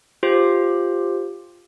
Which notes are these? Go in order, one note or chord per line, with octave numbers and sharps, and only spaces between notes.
F4 G4 C5